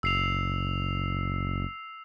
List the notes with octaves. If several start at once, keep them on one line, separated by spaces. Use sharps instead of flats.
F#1 E6 C7 F7